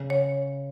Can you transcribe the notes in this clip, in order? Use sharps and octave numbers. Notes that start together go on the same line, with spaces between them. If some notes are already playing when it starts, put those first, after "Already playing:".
Already playing: C#3
C#5